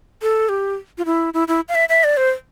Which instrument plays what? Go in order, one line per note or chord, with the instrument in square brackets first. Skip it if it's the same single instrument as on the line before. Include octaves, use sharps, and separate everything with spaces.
[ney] A4
G4
F4
E4
E4
E4
F5
E5
E5
D5
C5